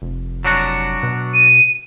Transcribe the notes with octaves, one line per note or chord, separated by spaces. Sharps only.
F1
F#3 D4 F#4
B2
D#7